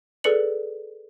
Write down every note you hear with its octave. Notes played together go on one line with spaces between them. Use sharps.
G#4 A4 B4 D5 C#7 F#7